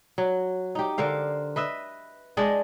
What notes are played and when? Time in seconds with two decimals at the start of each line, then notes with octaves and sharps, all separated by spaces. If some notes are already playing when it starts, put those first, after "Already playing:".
0.18 F#3
0.75 D#4 G4
0.98 D3 A#4 C5 F5
1.56 B4 D#5 E5
2.37 G#3 D4 D5 D#5